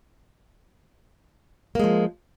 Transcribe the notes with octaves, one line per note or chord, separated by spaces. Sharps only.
F3 G#3 A#3